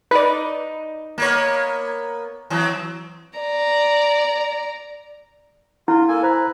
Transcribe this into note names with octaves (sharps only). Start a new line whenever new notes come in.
D#4 B4 D5
A#3 B3 C#5
E3 F#3 C4
D5 A#5
E4 F4
A#3 A4 G#5
B4 C5 A#5